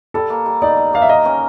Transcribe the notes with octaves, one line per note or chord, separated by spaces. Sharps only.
G3 A4
A#3
G3
D#4 D5
G3
A#3 F5
E5
A#4 D#5
C#4